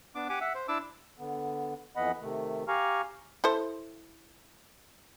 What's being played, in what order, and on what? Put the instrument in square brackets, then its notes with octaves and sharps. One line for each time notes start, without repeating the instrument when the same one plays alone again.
[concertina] B3 D4 D6
G4 F#5 G#5 D6
E5 F#5
C5
D4 E4 A5 D6 E6
[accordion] D3 B3
F2 E3 B3 D#5 F#5 B5
C3 D#3 A3
G4 F5 G#5 A#5 C#6 F6
[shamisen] E4 A4 C5